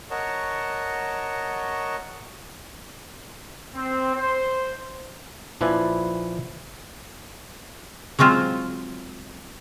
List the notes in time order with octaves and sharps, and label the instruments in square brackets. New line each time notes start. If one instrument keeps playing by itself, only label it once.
[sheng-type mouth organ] A#4 C#5 D#5 F#5 A5 C#6
[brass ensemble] C4
C5
[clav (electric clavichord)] A#1 F3 E4 B4 D5 G#5
[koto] F#3 G#3 C4 F4 C5